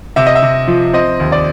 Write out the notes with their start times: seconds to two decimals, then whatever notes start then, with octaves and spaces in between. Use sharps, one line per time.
0.16 C3 E5
0.26 D#5
0.35 E5
0.42 C3
0.67 F3
0.93 C4 D#5
1.20 D#2
1.32 D5